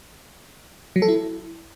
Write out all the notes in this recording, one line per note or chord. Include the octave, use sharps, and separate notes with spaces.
F#3
A4
E4